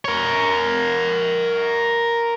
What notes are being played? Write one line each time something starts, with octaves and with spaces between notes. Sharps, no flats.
A#4 C#5